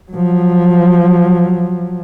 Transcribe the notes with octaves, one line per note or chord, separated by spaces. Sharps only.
F3 F#3